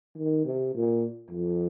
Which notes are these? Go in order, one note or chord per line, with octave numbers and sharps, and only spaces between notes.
D#3
C3
A#2
F2